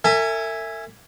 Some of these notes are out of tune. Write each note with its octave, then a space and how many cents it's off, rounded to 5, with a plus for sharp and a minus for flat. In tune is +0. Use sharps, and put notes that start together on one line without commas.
A4 +45 E5 +0 G#5 -5